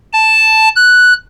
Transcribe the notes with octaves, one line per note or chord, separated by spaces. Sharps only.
A5
F#6